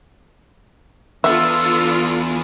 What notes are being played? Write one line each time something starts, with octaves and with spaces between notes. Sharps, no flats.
E2 D3 B3 D4 F4 A4 E5 E6